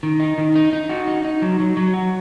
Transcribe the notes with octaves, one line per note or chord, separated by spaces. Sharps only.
D#3
D#4
D#3
D#4
D#4
F#4
D#4
D#4
F#3
F#3
F#3
F#4